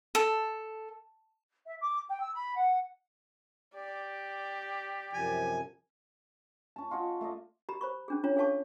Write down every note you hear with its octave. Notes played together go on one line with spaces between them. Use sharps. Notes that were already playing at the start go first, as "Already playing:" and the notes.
A4
E5
D6
G5
E6
B5
F#5
G4 D5
F#2 C3 F3 G#5
C#4 A5
F4 D#5 F#5 G#5
A3 D5 D#5
G4 A#5 B5
C5 B5 C#6
C#4 D4 G#4
C#4 D4 F4 C#5 A#5
D4 G#4 C#5 F5 A5 C#6